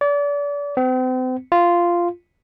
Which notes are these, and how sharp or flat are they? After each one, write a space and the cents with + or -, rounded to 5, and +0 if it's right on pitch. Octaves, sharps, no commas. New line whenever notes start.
D5 -35
C4 -40
F4 -10